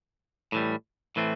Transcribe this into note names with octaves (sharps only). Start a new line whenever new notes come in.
A2 E3 G3
A2 E3 A3 C4